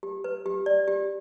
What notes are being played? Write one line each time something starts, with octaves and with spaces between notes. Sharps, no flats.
G4
B4
G4
D5
G4